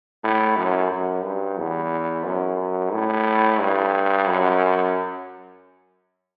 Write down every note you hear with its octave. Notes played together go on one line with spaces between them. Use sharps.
A2
F#2
F#2
G2
E2
F#2
A2
G2
F#2